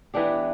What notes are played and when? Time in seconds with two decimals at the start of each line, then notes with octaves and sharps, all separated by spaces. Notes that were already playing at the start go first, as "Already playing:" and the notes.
0.14 E3 B3 D4 G4